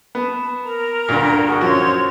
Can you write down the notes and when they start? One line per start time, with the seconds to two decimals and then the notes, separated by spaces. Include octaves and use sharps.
0.15 B3 A5
0.63 A#4 A#5
1.09 D2 G2 A#2
1.46 F#4 G#4 F#5
1.61 F#2 F3 F#4 C5 C#5 C6